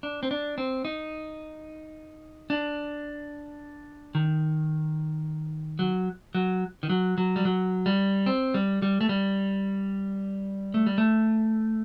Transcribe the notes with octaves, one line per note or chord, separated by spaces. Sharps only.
D4
C4
D4
C4
D#4
D4
D#3
F#3
F#3
D#3
F#3
F#3
G3
F#3
G3
C4
G3
G3
A3
G3
A3
G3
A3